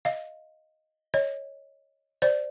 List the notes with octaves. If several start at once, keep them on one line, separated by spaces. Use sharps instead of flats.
D#5 F5
C#5 D#5
C5 D5